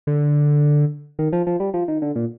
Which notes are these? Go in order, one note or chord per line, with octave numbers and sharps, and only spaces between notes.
D3
D#3
F3
F3
G3
F3
D#3
D3
A#2